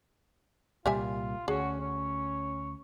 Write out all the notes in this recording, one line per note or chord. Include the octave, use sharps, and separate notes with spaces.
C2 A#2 G3 F4 G4 E5 G#5
D2 C#4 F#4 G#4
C#4 C#5